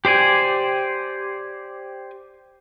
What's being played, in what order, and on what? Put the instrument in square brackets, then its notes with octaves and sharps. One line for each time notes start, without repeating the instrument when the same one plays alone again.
[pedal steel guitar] G4 C5 D5 G#5